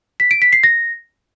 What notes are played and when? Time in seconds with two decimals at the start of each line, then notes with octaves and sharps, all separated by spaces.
0.20 B6
0.31 D7
0.42 B6
0.53 C7
0.63 A#6